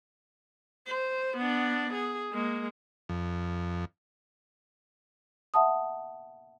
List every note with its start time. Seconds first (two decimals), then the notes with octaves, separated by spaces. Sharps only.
0.87 C5
1.38 B3 D4
1.94 G#4
2.33 G#3 A#3
3.09 F2
5.54 E5 F#5 A5 D#6